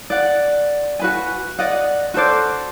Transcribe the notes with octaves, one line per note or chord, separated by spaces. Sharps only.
D5 F#5
F#4 B4 G#5
D5 D#5 F#5
F#4 A4 C5 D5